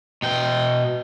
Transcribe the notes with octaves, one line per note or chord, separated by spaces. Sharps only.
B2 G5